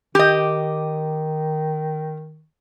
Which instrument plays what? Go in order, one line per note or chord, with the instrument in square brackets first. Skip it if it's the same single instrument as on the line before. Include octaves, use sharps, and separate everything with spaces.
[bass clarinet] D#3 [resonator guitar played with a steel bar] G4 D#5